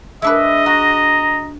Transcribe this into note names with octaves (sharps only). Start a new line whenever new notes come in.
G#3 D4 B4 D#5 E5
F#4 A#5